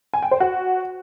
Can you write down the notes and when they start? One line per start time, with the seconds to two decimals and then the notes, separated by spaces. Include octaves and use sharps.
0.14 G#5
0.22 G5
0.31 C5
0.40 F#4